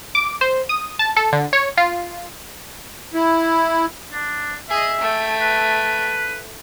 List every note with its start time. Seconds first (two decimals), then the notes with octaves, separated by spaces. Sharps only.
0.15 D6
0.41 C5
0.69 D#6
0.99 A5
1.16 A4
1.33 D3
1.53 C#5
1.77 F4
3.14 E4
4.13 D4
4.70 G#4 D#5 E5
5.01 A3 G5
5.42 B4